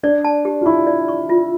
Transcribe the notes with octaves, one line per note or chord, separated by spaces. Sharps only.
D4 D5
A5
G4
F4
E4 C#6
D5
C#6
F4